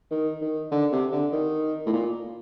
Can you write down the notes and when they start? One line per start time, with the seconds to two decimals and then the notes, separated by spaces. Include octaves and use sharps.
0.11 D#3
0.41 D#3
0.72 D3
0.92 C3
1.12 D3
1.33 D#3
1.86 A2
1.93 A#2